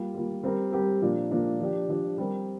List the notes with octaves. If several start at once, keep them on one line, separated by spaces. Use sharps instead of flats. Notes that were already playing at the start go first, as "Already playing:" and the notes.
Already playing: G3 A#3 F4
G3 A#3 F4
G3 C4 G4 A#4
G3 C4 G4 A#4
A#2 F3 A#3 D4
A#2 F3 A#3 D4
F3 D4 G4
F3 D4 G4
G3 C4 A#4